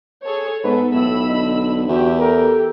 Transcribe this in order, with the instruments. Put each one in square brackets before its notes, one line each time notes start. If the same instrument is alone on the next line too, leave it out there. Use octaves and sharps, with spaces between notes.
[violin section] G#4 A4 C#5
[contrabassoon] G#2 [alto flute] B3 [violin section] A4 [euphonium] B4
[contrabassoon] B1 [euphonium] A2 [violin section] B5 E6
[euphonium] D3 [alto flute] D#5
[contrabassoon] E2 [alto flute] F#4 [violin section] G4 E5
[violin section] G4 [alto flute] A4 [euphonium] A#4